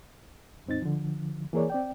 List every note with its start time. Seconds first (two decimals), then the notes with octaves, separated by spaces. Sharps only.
0.66 D#2 G#2 C4 D#4 A6
0.82 D3 F3
1.53 E3 A#3 G#4 A#4 C#5 D5
1.70 C4 D5 G5